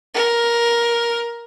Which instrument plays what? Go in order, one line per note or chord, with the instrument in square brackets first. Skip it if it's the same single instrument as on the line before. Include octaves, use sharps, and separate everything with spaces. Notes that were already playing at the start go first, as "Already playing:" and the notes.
[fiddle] A#4